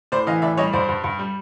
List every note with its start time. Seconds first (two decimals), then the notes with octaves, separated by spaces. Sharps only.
0.12 A2 C5 D5
0.27 E3 D#5 F5
0.42 A2 D5 E5
0.57 G3 C#5 D#5
0.73 G2 C5 D5
0.89 G2
1.04 G2
1.19 G3